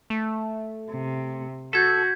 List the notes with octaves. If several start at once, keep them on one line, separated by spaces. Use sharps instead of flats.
A3
C3
F#4 A4 G6 G#6 B6